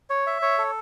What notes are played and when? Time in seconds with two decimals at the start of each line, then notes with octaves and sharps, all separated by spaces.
0.10 C#5
0.27 E5
0.42 C#5
0.58 A4